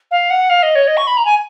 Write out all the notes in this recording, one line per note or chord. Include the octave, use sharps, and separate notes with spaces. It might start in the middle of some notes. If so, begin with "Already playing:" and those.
F5
F#5
F5
D#5
C#5
D#5
C#6
B5
A#5
G#5